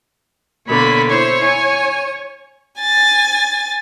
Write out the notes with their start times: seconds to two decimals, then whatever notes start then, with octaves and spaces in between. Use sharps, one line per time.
0.68 B2 D3 A#3 C#5 B5
1.09 E4 C5 C#5 C#6
1.44 G#5
2.81 G#5 A6